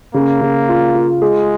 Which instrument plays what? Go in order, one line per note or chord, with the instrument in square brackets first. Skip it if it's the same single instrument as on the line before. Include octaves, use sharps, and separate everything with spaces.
[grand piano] C#3 [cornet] A#3
[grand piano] C#3
F4
F4
[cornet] G#3 [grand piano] G#4